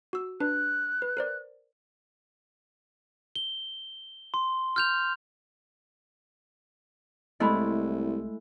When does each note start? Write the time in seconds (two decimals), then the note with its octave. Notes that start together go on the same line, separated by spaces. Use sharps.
0.13 F#4 E6
0.40 D4 B4 F#6
1.02 B4
1.17 A#4 C5 D5
3.35 G7
4.34 C6
4.76 F6 G6 F7
7.40 C2 G#3 A3 E4 D#5 B5